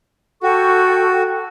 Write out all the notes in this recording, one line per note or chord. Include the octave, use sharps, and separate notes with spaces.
F#4 A4 G5 C#6